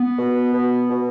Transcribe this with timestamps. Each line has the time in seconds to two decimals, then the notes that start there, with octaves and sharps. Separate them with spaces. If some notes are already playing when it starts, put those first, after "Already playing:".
Already playing: B3
0.18 B2
0.54 B2
0.90 B2